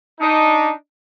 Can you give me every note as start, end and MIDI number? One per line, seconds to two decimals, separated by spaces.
0.20 0.71 62
0.20 0.71 63